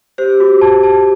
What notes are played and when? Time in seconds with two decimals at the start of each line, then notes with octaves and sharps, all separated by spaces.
0.18 G4 C5
0.40 F#4
0.61 A5
0.83 A5